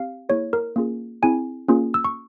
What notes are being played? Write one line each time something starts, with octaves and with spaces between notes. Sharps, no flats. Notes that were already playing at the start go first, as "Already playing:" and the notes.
Already playing: C4 G4 F5
A#3 E4 G#4 C#5
A#4
A#3 C#4 F4 G#4
C4 E4 G#4 G#5
A#3 C#4 F4 G#4
E6
C#6